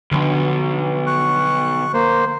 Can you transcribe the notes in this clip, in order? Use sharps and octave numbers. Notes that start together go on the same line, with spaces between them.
B1 D3 F3
C#6 F#6
A#3 C5